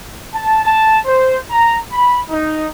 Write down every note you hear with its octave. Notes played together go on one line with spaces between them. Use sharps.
A5
A5
C5
A#5
B5
D#4